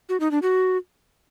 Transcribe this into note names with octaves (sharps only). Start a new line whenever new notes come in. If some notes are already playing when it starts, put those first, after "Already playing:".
F#4
D#4
D4
F#4